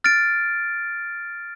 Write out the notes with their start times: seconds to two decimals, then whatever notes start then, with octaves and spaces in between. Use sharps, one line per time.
0.04 F6 A6 D7